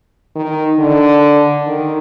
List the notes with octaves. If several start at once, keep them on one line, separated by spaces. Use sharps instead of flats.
D#3
D3
D#3